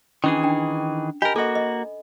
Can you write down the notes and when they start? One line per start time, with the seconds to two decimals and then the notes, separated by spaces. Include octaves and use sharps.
0.24 D#3 E3 C#4 D4 G#4
0.43 D4 G5
1.22 G4 A#4 D#5 G#5 B5
1.36 A#3 F#4 A4 D#5
1.55 D#5